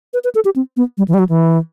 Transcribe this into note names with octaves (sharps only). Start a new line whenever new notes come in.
B4
B4
A4
G4
C4
B3
G3
E3
G3
F#3
E3